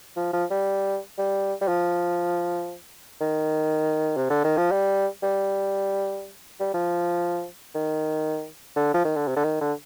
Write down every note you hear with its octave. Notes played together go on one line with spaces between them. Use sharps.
F3
F3
G3
G3
G3
F3
D#3
C3
D3
D#3
F3
G3
G3
G3
F3
D#3
D3
F3
D#3
D3
C3
D3
D#3
D3